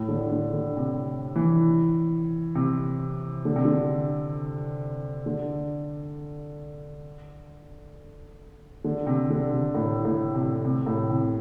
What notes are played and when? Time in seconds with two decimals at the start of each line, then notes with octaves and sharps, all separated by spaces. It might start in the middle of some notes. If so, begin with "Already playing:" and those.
Already playing: A2
0.09 D3
0.31 D3
0.53 D3
0.77 C3
1.36 E3
2.55 C3
3.45 D3
3.56 C3
3.65 D3
5.26 D3
8.84 D3
9.07 C3
9.30 D3
9.53 C3
9.75 A2
10.05 A2
10.35 C3
10.65 C3
10.86 A2
11.10 C3